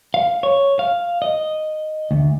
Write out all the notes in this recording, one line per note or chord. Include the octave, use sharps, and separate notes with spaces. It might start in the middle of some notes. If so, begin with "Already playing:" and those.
F5
C#5
F5
D#5
D2